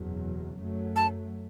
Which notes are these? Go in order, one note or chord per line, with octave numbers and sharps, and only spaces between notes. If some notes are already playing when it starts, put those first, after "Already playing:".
Already playing: F#1 E2 B2 F#3
F#2 F#3 A3
A5